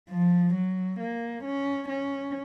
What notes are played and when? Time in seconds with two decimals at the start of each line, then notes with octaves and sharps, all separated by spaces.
0.10 F3
0.54 F#3
1.00 A#3
1.44 C#4
1.89 C#4